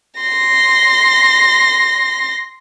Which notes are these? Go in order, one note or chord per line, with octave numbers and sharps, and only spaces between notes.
C6 A#6